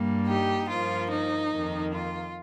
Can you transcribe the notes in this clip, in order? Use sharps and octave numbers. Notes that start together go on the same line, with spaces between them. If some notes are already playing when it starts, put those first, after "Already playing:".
Already playing: G2 G3 A#3
D#4 G4
G2 F3 A#3 F4
D#4
F2 D#3 A#3
F4